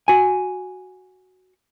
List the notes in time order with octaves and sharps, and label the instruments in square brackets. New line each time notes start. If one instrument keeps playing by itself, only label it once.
[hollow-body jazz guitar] F#4 G#5